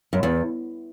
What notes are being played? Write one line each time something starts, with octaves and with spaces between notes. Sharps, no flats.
F#2
E2